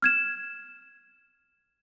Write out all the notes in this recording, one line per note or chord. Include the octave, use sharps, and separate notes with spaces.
F6 G#6 E7